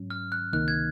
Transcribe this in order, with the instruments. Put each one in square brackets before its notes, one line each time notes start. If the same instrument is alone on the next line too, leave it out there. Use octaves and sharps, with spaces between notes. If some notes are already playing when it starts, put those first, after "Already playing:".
Already playing: [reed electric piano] G#2 F#3 C#4
[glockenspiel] F6
F#6
[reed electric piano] C#2 C3 D#3 A#3 D#4 [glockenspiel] F#6
[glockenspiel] G#6